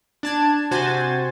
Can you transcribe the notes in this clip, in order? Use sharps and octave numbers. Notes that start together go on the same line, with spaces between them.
D4 A5 G#6
C3 F#4 C5 G#5 A6